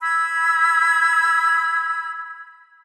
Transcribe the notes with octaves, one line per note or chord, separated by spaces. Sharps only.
B5 E6 G#6